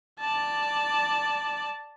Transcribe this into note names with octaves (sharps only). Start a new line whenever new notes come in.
D5 A5